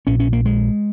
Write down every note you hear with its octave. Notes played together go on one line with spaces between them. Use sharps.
A#1 A#2 C#4
C#4
A#3
G#3